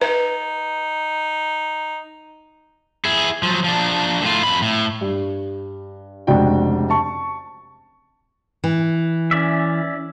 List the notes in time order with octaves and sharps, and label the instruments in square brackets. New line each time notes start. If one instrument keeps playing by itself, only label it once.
[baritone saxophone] D#4 [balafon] B4
[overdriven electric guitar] E4 G#4
F3 F#3
F3 D4
A2 F4
F2 B5
A2
[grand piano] G2
F1 C#2 D4 F#4 G5
A5 C#6
[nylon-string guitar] E3
[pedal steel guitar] C#4 D5 E5